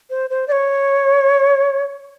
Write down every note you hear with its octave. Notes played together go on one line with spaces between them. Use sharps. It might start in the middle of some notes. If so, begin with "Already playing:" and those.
C5
C5
D5
C#5